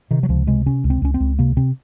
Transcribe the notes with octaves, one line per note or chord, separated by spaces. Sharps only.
C3 D#3
F#3
C#2 F3
C3 G#3
C3 C#4
C#2
C4
C#2 C#4
C4
C#2
C3 A#3
C3 C4